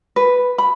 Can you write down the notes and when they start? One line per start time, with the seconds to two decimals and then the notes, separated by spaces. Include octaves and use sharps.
0.16 B4
0.58 B5